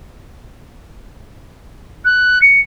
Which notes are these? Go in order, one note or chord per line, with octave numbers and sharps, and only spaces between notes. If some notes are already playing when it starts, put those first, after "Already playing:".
F#6
C#7